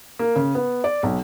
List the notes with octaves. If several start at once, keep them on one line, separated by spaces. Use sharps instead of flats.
A#3
C#3
B3
D5
B1